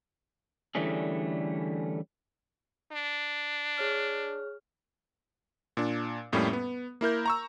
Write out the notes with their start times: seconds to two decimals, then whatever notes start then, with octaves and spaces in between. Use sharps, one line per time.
0.75 D3 E3 G3 A3 C#4 G#4
2.93 D4
3.78 G#4 C#5 F6
5.77 A#2 D4
6.32 F2 A2 G3 A3 A#3 C#4
6.53 B3
7.01 A#3 E4 A#4 G6
7.26 A#5 C#6 E6